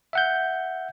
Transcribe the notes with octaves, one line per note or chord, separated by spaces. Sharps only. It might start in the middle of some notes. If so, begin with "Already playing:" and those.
E5 F#5 G6